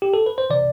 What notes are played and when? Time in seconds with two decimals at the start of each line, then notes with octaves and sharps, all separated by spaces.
0.02 G4
0.14 A4
0.26 B4
0.38 C5
0.50 C3 E3 D5